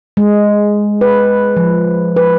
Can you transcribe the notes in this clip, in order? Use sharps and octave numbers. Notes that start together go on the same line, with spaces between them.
G#3
B4
F3
B4